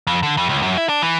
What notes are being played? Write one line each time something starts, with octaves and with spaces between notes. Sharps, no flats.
F2
D3
F2
C#2
F#2
E4
D4
E3